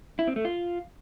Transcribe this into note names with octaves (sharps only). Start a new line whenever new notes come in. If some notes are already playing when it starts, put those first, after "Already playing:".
E4
C4
A3
F4